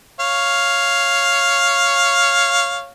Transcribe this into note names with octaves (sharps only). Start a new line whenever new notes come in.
C#5 F5